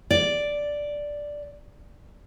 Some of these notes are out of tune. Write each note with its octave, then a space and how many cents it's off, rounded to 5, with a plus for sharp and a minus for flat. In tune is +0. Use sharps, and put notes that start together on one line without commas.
D5 +0